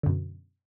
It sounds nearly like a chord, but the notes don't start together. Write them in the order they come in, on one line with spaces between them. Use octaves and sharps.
D3 F#2 B2